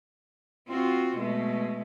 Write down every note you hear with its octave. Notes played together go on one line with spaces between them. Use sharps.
C4 F4 F#4
B2 G#3 A3